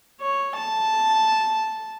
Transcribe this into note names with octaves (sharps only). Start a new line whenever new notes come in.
C#5
A5